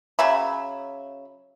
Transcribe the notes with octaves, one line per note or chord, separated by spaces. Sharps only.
C#3 F#3 E5 B5